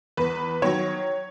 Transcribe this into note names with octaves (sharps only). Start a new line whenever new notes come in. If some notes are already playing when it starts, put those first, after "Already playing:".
E2 B4
D#3 F#3 C#5